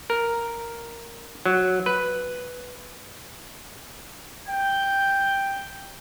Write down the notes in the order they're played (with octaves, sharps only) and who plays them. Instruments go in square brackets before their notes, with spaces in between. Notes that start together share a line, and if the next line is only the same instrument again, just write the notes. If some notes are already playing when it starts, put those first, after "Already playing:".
[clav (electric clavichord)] A#4
F#3
B4
[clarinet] G5 [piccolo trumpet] G6